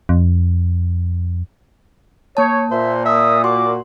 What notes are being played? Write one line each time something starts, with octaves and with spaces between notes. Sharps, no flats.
F2
A#3 C#5 A5
A#2 C5 E5
E5 D#6
F#4 C6 D6